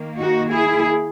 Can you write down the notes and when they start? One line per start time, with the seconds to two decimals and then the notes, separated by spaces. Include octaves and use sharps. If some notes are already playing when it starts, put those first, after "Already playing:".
Already playing: D#3 A#3
0.20 D#4 F#4
0.51 E4 G#4